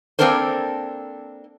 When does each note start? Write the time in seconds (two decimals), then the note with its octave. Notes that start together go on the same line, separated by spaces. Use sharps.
0.19 A#3 C4 D4 A4 A#4 C5